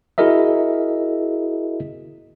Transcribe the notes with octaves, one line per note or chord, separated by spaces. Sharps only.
E4 F#4 G#4 A#4 D#5 E5